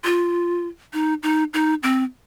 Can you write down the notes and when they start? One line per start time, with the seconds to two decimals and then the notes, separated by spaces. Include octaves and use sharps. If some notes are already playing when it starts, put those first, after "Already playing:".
0.04 F4
0.93 D#4
1.23 D#4
1.54 D#4
1.83 C4